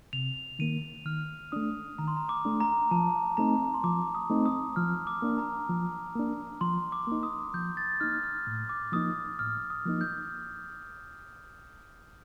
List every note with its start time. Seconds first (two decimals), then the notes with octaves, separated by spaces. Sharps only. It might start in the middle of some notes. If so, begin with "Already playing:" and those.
0.13 C3 F7
0.59 D#3 A#3 D#7
1.05 D#3 F6
1.52 A3 D4 D#6
1.98 D#3 A#5
2.08 C6
2.17 A#5
2.29 D6
2.45 A3 D4
2.60 A#5
2.91 F3 A5
3.37 A3 C4 D#4 A#5
3.74 C6
3.84 F3 D6
4.15 D#6
4.30 A3 C4 D#4
4.46 D#6
4.76 F3 F6
5.07 D6
5.22 A#3 D4
5.38 A#5
5.69 F3
6.15 A#3 D4
6.61 F3 C6
6.92 D6
7.07 A#3 D#4
7.23 D#6
7.54 F3 G6
7.77 A6
8.00 A#3 D#4 F6
8.23 F6
8.47 A2
8.69 D6
8.92 F3 A#3 D#4 D#6
9.39 A2 F6
9.70 D#6
9.85 F3 A#3 D#4
10.01 G6